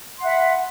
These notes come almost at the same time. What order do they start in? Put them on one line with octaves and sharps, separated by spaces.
C6 F#5 E5 B5